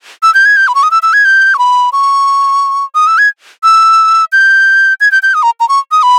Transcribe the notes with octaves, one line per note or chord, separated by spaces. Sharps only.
E6
G6
G#6
G6
B5
C#6
D#6
E6
E6
G#6
G6
C#6
B5
C#6
D#6
E6
G#6
E6
G6
G#6
G6
G6
D#6
A#5
A#5
C#6
D#6
B5